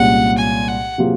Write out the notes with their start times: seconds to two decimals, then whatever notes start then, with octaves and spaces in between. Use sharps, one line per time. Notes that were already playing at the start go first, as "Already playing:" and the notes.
Already playing: C2 A#2 G#3 C#4 F4 F#5
0.38 G#5
0.68 F#5
0.98 C3 F#3 A#3 F4 G#4